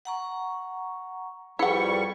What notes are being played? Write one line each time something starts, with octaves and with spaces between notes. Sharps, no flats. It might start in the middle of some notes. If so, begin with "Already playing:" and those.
F#5 A#5 C#6
F2 G3 E4 G#4 B4 F#5 G5 C#6